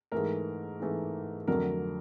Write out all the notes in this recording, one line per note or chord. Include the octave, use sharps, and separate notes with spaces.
G#2 E3 A3 A#4
G#2 E3 A3
F2 D3 F#3 A3 A#4